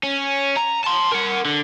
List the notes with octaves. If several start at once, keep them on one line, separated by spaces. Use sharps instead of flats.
C#4
A#5
A5 C6
A#4 F#5
D3